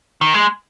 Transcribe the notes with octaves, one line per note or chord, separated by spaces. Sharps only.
D#3
G#3